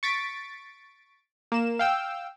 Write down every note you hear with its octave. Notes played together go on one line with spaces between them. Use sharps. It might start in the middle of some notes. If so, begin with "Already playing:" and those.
C#6 A6 B6 D7
A#3 E7
F5 G5 E6